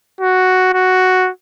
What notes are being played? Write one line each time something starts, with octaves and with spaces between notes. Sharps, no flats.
F#4
F#4